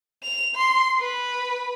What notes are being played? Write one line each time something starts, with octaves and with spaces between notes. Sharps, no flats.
F7
C6
B4